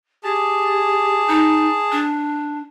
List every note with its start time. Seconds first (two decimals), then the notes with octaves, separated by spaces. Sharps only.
0.24 G4 G#4 A5
1.28 D#4
1.92 D4